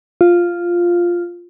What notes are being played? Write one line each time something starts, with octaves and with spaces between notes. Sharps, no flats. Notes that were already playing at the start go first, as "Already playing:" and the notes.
F4